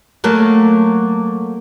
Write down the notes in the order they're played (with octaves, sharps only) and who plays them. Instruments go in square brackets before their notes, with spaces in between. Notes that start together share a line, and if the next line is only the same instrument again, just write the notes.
[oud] F#3 A3 A#3